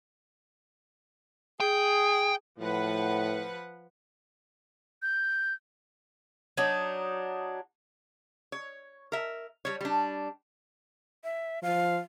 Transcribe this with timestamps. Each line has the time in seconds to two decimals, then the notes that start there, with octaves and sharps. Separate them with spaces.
1.60 G#4 G5
2.60 A2 F3 B4 F#5
5.02 G6
6.57 F#3 D4 D#4
8.52 C#5
9.12 A#4 E5
9.65 G3 C#5
9.81 G3 D4
11.24 E5
11.63 F3 F5